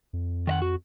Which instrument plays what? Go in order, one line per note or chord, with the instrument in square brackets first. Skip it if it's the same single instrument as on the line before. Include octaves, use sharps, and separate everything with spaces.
[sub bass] F2
[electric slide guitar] D#3 D#5 F#5
F#4